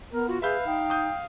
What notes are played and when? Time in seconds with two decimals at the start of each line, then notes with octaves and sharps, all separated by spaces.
0.12 B3 A#4
0.28 F4 F#4
0.42 G#4 B4 E5 F5 B5 G6
0.65 D#4 G5
0.90 D#6 G6